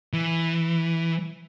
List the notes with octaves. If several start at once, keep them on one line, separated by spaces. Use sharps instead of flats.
E3